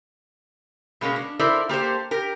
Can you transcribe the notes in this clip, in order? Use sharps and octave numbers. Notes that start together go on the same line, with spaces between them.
B2 G#3 A#3 C#4
D4
E4 A4 A#4 C5 D5
A#3 G4 A4 C5
G4 A#4